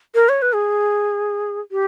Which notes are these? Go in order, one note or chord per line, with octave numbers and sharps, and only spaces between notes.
A#4
C#5
B4
G#4
G4